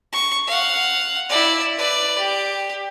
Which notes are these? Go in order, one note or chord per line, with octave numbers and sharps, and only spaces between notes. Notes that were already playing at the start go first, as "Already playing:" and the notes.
C#6
F5 F#5
E4 D5
B4 D5
G4